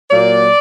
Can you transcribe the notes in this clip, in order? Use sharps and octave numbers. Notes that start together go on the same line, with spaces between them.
A#2 F#3 A#3 D5